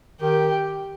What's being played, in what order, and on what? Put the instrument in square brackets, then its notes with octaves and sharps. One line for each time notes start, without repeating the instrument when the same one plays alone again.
[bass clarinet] D#3 [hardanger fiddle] G4